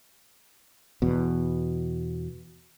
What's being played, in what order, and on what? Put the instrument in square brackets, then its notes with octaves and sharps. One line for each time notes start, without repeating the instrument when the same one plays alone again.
[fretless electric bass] E2 B2